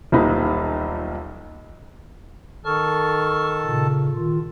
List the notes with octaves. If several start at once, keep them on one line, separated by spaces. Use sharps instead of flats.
D#1 B1 A#2 D#4 B5
D#3 A4 A5 C#6 F6
A#2 C#3
D#3 F4